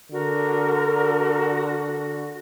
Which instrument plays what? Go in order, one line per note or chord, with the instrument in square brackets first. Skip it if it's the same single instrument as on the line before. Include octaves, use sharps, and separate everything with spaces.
[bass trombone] D3 [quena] F#4 [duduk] A#4